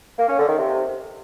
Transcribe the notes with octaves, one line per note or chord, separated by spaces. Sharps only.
A#3
C#4
D3
D#3
C3